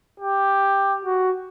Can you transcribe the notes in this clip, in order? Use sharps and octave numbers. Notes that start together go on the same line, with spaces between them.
G4
F#4